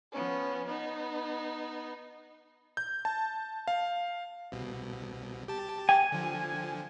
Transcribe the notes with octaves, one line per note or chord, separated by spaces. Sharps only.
F3 B3 C#4
B3 D#4
G6
A5
F5
C2 B2
G4 A5
G5 G#5
D3 F3